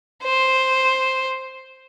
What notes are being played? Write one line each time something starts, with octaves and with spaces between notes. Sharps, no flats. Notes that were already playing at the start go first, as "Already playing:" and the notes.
C5